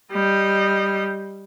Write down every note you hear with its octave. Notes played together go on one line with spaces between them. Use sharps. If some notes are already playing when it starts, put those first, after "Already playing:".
G3 D#5